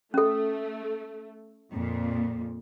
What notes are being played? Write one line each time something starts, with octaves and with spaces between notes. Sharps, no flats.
A3 C#4 A4
F2 A#2